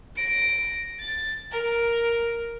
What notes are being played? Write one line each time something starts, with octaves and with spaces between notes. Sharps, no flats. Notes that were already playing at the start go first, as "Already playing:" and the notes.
A#6 D7
A6
A#4